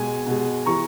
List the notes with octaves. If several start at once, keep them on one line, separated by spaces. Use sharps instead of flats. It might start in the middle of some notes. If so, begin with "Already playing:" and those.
Already playing: B2 G#3 G#5
B2 G#3
E3 G#3 A#5 C#6